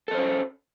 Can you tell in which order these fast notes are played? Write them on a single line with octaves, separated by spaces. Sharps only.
A4 D#5 C5 C#4